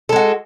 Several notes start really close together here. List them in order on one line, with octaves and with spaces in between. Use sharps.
A4 G#3 F#4